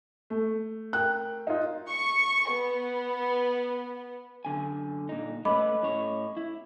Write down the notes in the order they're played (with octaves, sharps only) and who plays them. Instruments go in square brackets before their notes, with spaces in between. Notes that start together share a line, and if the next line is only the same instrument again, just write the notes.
[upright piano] A3
[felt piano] A#4 G5 F#6
[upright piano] D#4 F4
[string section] C#6
B3
[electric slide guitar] F#2 D3 G#5
A#2 D#4
[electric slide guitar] A3 C#4 B4 [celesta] D#5 B5 D6
[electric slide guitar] A2 C#4 C#5
E4